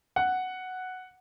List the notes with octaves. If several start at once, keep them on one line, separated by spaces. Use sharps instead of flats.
F#5